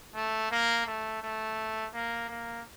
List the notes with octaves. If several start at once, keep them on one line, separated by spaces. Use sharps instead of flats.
A3
A#3
A3
A3
A#3
A#3